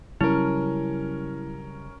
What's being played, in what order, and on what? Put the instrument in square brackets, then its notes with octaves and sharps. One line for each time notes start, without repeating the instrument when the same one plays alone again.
[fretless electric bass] C#3 F#3 G3 [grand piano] C#4 A#4 [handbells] E4